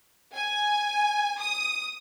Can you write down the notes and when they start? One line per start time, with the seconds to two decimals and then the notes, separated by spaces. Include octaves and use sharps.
0.35 G#5
1.39 D#6